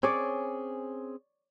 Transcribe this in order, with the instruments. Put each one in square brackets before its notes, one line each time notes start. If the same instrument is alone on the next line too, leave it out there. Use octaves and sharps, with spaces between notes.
[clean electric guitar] C4 C#4 G#4 [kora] C#5 D5